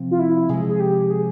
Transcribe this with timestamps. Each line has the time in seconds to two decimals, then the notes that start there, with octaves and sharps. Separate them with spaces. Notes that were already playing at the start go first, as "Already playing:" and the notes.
Already playing: C3 F3 C4
0.11 F4
0.19 E4
0.49 C3 F3 G#3 G#4
0.69 G#4
0.80 G4
1.10 G#4